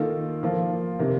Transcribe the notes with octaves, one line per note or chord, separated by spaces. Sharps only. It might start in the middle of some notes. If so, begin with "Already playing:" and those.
Already playing: D#3 A#3 F4 A4
F3 A#3 F4
C3 D#3 A#3